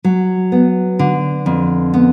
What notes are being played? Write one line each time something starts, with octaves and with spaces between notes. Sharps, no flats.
F#3
B3
D3
F2
B3